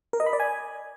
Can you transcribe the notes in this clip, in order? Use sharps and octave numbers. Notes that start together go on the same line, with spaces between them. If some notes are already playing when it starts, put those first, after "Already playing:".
A#4
D#5
B5
D5
G#5